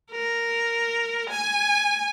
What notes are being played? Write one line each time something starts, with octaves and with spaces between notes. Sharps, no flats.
A#4
G#5